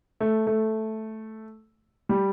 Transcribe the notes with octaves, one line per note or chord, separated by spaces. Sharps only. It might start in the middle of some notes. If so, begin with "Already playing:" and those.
A3
A3
G3